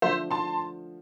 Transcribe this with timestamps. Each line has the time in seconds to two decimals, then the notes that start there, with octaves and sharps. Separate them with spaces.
0.02 D3 F3 A3 C5 E5
0.31 A5 C6